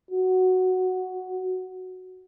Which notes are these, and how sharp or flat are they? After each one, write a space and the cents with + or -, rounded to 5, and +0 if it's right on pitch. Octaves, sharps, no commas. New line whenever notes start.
F#4 +0